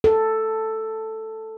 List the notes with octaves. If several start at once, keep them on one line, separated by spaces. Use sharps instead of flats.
A4